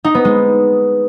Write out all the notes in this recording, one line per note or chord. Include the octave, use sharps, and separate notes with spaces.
D#4
B3
G#3